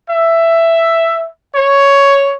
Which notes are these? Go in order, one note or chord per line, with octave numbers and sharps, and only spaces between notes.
E5
C#5